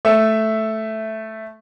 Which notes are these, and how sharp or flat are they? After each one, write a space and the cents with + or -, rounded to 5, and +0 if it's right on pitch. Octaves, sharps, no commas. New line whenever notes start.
A3 -5 E5 +0